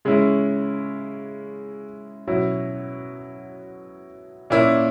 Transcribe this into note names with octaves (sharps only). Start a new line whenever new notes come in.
C#3 G#3 C#4 E4
B2 F#3 C#4 E4
A#2 A#3 C#4 E4